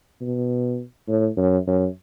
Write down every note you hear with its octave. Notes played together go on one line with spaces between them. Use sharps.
B2
A2
F#2
F#2